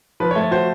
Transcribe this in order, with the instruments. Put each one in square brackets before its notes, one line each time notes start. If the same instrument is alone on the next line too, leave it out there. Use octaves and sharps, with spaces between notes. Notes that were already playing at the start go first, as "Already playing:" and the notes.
[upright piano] F3 [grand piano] B4
[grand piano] C#5
[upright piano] A3
[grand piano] C#5
[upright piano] F#4 [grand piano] C5